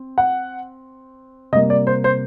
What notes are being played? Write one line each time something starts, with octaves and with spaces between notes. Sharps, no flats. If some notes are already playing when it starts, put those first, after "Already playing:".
Already playing: C4
F#5
C3 G3 A#3 D#5
D5
C5
C5